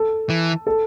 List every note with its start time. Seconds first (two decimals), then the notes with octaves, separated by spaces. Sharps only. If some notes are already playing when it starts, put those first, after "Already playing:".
Already playing: A4
0.30 E3
0.67 A4